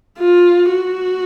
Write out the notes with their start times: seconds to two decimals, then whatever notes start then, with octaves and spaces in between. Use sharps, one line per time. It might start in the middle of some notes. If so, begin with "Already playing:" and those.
0.18 F4
0.70 F#4